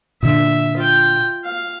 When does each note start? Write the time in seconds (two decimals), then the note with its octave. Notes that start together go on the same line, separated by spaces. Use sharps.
0.23 A#2 D3 E5
0.77 F4 G5
1.45 F5